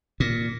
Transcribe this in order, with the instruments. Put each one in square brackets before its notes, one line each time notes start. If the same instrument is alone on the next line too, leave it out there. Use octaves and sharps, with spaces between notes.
[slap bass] A#2